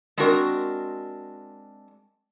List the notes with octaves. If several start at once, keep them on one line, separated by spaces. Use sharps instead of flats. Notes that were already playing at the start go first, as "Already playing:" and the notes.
G#3 C4 D4 F#4 A#4